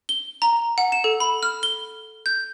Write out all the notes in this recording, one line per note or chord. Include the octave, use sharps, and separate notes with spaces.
G7
A#5
F#5
E7
A4
B5
F6
G7
G6